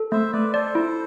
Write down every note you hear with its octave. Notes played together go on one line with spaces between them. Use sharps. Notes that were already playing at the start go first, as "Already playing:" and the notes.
Already playing: A4
A3 C5 E5
A3 B4 D5
A4 C5 D5
E4